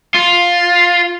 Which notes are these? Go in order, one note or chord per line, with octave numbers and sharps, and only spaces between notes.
F4